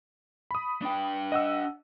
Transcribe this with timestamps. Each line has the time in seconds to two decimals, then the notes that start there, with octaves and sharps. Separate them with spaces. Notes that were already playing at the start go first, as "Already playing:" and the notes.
0.51 B5 D#6
0.82 D4 G5
1.32 D#5 F#5 E6